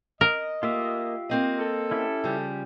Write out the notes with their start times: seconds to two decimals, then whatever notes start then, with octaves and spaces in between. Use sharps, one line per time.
0.21 A#4 D#5
0.63 A#3 F4 G4 E5
1.29 A#3 C4 D#5
1.59 A4
1.91 C#4 E4 G4
2.24 C#3 F3 G3